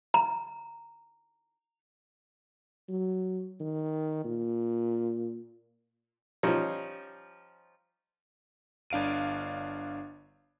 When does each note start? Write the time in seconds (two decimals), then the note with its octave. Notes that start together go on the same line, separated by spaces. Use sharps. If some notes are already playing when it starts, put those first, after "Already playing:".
0.14 A#5
2.89 F#3
3.60 D#3
4.24 A#2
6.43 F3 G3 C#4 D#4
8.90 G1 D4 F5 D7 D#7